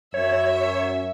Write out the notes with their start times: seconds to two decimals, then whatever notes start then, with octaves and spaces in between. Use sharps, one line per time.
0.14 F#2 C#5 E5